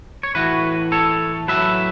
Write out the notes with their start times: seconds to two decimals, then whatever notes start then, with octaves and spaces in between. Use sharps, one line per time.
0.23 C#5
0.35 A2 E3 F#4 B4
0.92 A4 C#5
1.48 A2 F#3 B4 E5